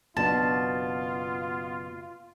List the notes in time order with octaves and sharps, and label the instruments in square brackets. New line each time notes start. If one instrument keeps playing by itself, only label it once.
[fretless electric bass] F#1 B2 D4 [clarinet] B3 [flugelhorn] F4 [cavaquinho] A5